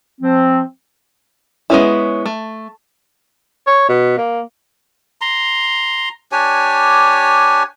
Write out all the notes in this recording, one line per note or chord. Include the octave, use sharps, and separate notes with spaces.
F3 C4
G#3 B3 C#4 E4
A3
C#5
B2
A#3
A#5 C6
D4 G4 C#5 G#5